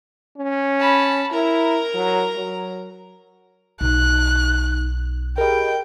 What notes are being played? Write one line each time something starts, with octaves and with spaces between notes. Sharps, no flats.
C#4
A5 B5
E4 A#4 A#5
F#3
F#3
B1 D#4 F#6
G4 G#4 A#4 D#5 G5 B5